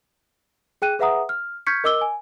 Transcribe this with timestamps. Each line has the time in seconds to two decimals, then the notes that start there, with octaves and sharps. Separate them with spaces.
0.82 G#4 G5 F#6 D#7
0.99 G#4 B4 E5 F#5 A#5 D#6
1.29 F6
1.67 C#6 F6 G6 G#6 B6 C#7
1.84 A#4 D#5 D6 E6 G7
2.01 G#5